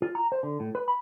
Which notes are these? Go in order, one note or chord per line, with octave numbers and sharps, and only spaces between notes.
F4
A#5
C5
D3
A2
B4
B5